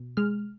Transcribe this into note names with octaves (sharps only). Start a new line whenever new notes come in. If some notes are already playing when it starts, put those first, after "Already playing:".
Already playing: B2
G#3 F6